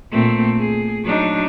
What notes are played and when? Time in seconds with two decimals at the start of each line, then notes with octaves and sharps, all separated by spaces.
0.11 A#2 A3 C4
0.59 G#4
1.04 F#3 D4 D#4